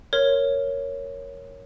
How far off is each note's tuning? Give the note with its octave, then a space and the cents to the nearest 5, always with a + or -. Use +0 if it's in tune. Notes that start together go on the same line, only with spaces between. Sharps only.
A#4 +0 C#5 +0